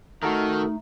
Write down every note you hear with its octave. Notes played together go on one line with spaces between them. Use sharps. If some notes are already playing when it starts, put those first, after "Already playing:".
D#3 A3 D#4 F#4 A4 A#4